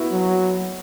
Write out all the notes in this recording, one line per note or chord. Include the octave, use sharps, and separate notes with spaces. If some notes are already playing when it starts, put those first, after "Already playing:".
Already playing: B3 E4 F#4
F#3